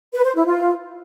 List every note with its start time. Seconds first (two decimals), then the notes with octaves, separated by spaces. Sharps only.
0.14 B4
0.25 C5
0.35 E4
0.46 F4